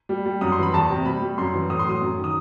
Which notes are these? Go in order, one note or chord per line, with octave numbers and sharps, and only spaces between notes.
G3
G3
F#2 D#6
C6
E3 B5
E2 A5
C3
G3 B5
G3
F#2 C6
E3
A2 D#6
C6
F#3 D#6
F#2
D#3
D#6